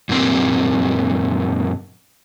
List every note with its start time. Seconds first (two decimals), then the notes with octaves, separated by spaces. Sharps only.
0.09 F#2 A#2 A#3 C4 G4